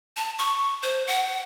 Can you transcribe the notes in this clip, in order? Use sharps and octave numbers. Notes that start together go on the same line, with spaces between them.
A5
C#6
C5
F#5